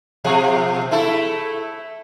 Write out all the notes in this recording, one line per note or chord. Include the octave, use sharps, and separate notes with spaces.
B2 F3 G#4
A3 E4 A4